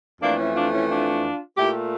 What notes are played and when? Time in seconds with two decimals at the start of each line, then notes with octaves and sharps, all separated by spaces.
0.21 F2 E3 A3 A#3 D4
0.38 C#4 E4
0.55 D4 F4
0.71 C#4 E4
0.89 D4 F4
1.56 A#2 A3 E4 G4